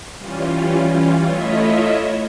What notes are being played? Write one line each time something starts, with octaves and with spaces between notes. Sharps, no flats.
E3 G3 C#4 F4
A3 E4 F4 C#5 D#5 E5